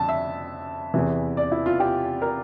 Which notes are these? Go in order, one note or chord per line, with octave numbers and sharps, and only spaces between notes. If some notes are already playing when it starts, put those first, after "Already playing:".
Already playing: F2 D3 A5
E5
E2 C3 E3
D5
E4
F4
G4
A#4